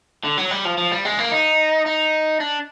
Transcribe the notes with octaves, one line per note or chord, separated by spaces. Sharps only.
D3
F#3
G3
F3
F3
G3
G#3
A#3
D#4
D#4
D4